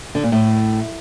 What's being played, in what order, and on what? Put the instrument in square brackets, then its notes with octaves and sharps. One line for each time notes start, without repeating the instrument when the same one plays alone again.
[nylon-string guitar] D3
A#2
A2